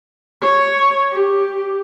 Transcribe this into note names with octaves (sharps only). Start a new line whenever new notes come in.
C#5
G4